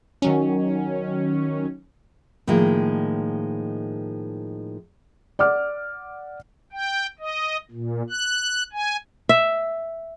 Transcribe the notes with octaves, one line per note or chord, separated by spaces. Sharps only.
D#3 F#3 C#4
A2 D#3 F3 G#3 A#3
D5 F#5 D6 F6
G5
D#5
A#2
F#6
G#5
E5